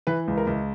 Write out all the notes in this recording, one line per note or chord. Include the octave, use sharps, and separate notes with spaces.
E3 B4
C#2
A#4
C#2